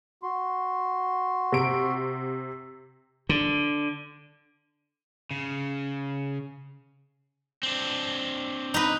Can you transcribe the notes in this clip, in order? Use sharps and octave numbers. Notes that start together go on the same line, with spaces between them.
F#4 C6
C3 D7
D3
C#3
C4 D4
D#4 B4